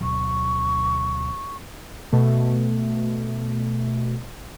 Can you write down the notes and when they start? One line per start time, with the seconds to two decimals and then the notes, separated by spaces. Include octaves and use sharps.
0.01 D2 B2 F#3 C#6
2.12 B2 A3